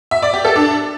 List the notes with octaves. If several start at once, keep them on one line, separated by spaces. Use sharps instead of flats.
E5
D5
G4
A4
D4